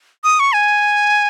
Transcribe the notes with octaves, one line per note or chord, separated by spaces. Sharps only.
D#6
C#6
G#5